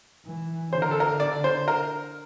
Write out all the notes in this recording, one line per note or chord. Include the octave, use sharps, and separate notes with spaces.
E3
D3 C5
A#4
A4
A#4
D5
C5
A#4